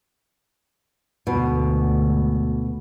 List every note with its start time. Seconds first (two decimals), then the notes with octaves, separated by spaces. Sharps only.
1.27 D2 G#2 B2